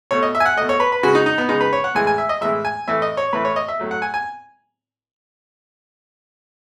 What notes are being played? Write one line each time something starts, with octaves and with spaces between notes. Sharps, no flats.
B2 A3 C#5
D#5
E5
G#5
F#5
B2 A3 D#5
C#5
B4
B4
C#3 G#3 F#4
D#4
D#4
B3
C#3 G#3 D#4
B4
C#5
F#5
A2 E3 G#3 G#5
G#5
E5
D#5
A2 E3 G#3 E5
G#5
A2 E3 A3 E5
D#5
C#5
A2 E3 A3 B4
C#5
D#5
E5
A2 F#3 A3
F#5
G#5
G#5